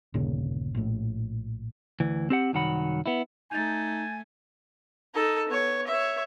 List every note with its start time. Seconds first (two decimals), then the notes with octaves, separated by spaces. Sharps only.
0.14 G1 D#2 A#2 C#3
0.75 A#1 A2
2.00 D2 E3
2.30 C4 G4 F#5
2.53 C2 F#2 D#3 F#3 F#5 B5
3.06 B3 E4
3.51 A3 D#4 G#5 G6 A6
5.15 D#4 A4
5.49 B3 C#5
5.87 C#5 E5